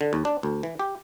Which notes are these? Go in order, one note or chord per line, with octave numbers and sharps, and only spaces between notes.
D3
D#2
D4
D2
E3
G4